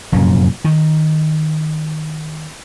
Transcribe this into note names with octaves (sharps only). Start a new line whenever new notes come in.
F1 F#2 A#2 C#3
D#3